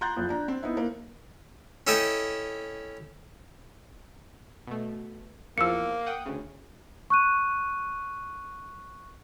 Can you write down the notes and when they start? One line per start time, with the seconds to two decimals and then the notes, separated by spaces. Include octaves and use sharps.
0.01 A#5 C6 F#6 G6 A6
0.16 F#1 F2
0.29 D4 A#5
0.48 C4
0.63 B3 D#4 E4
0.77 A#3
1.87 C#4 E4 A4 D#5 G5
4.67 B2 A3
5.58 E2 F3 A#3 E6 C#7
6.06 F#5 G5 D#6
6.26 D2 C#3
7.10 C#6 F#6 D#7